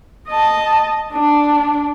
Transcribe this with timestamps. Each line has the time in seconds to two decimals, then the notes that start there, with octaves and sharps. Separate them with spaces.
0.29 D#5 A5
1.13 D4